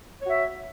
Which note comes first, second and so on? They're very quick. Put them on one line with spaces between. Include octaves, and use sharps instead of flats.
C#5 F#4 E5